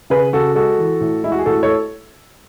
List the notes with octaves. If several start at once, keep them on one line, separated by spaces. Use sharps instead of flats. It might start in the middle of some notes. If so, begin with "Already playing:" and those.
C#3 G#4 B4
C#3 F#4 A4
G#3 F#4 A4
E3
A2
G#3 E4
F#4
G#4
A2 F#4 A4
A4 C#5